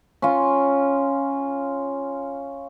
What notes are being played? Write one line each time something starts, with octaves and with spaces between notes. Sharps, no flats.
C#4 F4